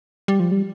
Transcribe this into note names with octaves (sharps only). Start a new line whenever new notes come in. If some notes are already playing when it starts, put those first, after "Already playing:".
G3
F3
G3